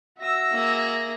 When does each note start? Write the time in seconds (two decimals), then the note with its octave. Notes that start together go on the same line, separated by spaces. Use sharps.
0.19 F#4 E5 E6 A#6
0.51 A#3 G#4